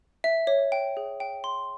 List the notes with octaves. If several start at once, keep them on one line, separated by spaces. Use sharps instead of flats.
E5
C#5
G5
G#4
G5
C6